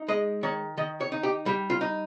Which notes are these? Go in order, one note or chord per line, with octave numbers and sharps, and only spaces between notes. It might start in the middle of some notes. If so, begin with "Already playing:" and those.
Already playing: D#4
G#3 D#5
D#3 C#5
D#3 D#5
C#5
D#4
G4
G3 G4
F4
D#4